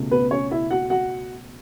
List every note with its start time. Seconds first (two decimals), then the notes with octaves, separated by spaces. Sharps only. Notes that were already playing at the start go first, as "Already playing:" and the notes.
Already playing: C#2 B2 A3 C#4
0.11 B3 B4
0.31 C#4 C#5
0.51 E4 E5
0.71 F#4 F#5
0.90 F#4 F#5